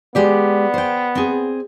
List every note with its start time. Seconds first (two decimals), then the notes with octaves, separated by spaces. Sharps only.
0.15 G#3 B3 G4 D5
0.74 C5 G5
1.15 C4 G#4